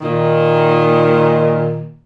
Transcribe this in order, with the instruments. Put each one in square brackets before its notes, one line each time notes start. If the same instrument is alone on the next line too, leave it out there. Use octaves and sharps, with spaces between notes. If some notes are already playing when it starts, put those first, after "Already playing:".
[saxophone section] A#2 D#3